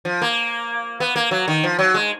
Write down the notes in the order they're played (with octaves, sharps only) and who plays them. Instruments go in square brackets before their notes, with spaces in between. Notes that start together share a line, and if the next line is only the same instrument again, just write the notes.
[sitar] F3
A#3
B3
A#3
F#3
D#3
F3
F#3
G#3